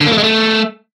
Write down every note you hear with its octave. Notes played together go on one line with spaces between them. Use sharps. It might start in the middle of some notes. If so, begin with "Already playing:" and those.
D3
A#3
A3
G#3
A3